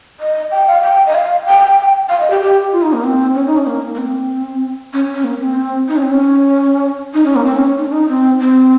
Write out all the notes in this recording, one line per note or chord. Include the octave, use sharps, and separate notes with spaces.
D#5
G5
F5
G5
D#5
F5
G5
F5
D#5
G4
G4
F4
D#4
A#3
C4
C#4
D#4
C#4
A#3
A#3
C4
C#4
C#4
A#3
C4
D#4
C#4
C4
C#4
D#4
C#4
A#3
C4
C#4
D#4
C#4
D#4
C4
C4